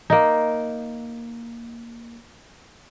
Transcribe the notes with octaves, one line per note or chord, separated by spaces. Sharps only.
A#3 D#4